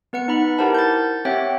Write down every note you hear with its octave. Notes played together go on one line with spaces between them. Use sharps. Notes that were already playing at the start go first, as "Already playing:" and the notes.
B3 B4 F#5 C#7
D#4 B4 B5
E4 G4 A#4 C5 F#5 A5
G6 A6
C4 G4 C#5 E5 F#5 G5